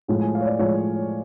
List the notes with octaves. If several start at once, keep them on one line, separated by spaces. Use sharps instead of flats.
A2 F3 G#3
G#5
F5
C#5
D5
A2 F3 G#3 C#5